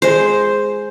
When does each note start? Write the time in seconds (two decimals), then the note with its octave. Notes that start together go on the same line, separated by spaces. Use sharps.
0.02 G#3 C5